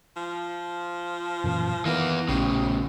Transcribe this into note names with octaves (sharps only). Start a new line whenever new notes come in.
F3
F#2 A#2 E3
D#3 E3 A#3 B3
A#1 A2 C#3 G4